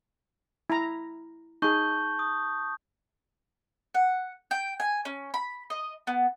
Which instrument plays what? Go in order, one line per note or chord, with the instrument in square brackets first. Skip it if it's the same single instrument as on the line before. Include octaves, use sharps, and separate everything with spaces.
[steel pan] E4 A#5
[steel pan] D#4 G#4 [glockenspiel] A5 C#6 G6
[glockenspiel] D#6
[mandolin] F#5
G5
G#5
C#4
B5
D#5
B3